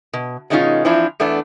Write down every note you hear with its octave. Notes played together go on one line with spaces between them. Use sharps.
B2
B2 D#3 G#3 C#4 D#4 F4
E3 F3 C4 D4 E4
E2 A3 B3 D4